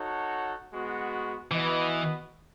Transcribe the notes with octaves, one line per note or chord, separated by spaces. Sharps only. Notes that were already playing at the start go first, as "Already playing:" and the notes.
Already playing: D#4 F#4 A4 C#5 F#5
G#3 B3 F#4
E3 B3 F#4 B4 D#5